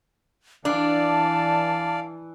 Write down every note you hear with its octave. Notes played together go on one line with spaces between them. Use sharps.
E3 D4 D5 F5 A5